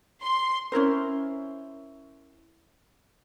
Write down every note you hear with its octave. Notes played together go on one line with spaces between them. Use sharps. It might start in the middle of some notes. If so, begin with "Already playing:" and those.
C6
C#4 E4 A#4 C5